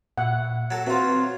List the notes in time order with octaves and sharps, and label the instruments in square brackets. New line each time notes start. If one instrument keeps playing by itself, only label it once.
[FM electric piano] A#2 E5 [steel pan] F#5
[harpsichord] F#3 A4
[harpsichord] F#3 F4 [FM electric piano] C4 [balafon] F#4 B4 E5